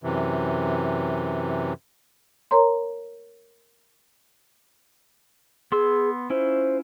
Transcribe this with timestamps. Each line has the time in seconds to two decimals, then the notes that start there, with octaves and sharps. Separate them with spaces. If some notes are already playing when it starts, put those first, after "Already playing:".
0.04 F#2 C3 E3
2.51 A#4 C#5 A#5 C6
5.72 B3 G#4 C6 E6
6.30 C#4 E4 F4 C5